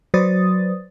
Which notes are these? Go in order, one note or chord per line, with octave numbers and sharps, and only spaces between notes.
F#3 B4 C5 D5 D#6 A6